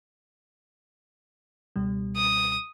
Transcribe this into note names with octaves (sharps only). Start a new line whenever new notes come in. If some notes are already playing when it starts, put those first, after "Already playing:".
C#2 B2 G3
D#6